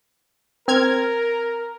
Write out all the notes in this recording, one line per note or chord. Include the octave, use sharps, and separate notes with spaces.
C4 A#4 F6 G#6